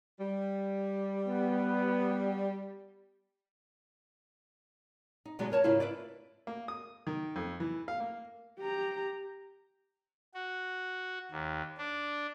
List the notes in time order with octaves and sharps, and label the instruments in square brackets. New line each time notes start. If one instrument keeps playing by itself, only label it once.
[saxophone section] G3
[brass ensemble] B3
[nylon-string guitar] D#4
B2 D3 F#3 G#3 B3
A#4 C#5 A5
G#2 C#3 A#3 C#4 E4 F4
E4 B4 D5
[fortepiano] A#3
D#6
D#3
F2
E3
F5
A#3
[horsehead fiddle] G4 A#5
[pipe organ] F#4
D#2
D4